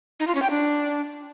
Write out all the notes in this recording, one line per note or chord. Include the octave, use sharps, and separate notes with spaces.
D#4
F4
C#4
G5
D4